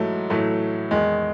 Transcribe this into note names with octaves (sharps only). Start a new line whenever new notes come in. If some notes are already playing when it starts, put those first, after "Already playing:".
Already playing: G#2 E3 F#3 A3
A2 E3 F#3 A3
E2 D#3 G#3